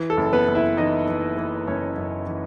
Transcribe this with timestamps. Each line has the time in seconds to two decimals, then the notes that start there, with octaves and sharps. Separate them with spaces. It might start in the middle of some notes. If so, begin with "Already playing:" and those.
Already playing: E3
0.10 A4
0.17 F#1
0.33 B3 B4
0.48 F#1
0.55 E4 E5
0.77 E3 D#4 D#5
1.07 E3
1.37 E3
1.67 F#1 C#4 C#5
1.97 F#2
2.27 E3